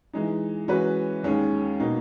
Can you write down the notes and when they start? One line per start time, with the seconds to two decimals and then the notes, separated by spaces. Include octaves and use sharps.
0.13 E3 G#3 D#4
0.68 E3 G#3 C#4 F#4 B4
1.23 D#2 D#3 G#3 C#4
1.80 B2 A#3 D#4